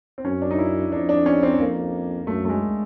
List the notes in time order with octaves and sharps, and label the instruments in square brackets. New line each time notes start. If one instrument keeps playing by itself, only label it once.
[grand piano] C4
[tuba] F#2 [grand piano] C#4
[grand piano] D4
D#4
E4
[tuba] F2 [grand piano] D4
[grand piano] D4
C#4
C4
[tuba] F2 [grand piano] A#3
[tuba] F#2 [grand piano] A3
[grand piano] A3
G#3